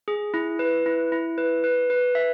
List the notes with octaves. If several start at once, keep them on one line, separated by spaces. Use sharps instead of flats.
G#4
E4
B4
E4
E4
B4
B4
B4
E5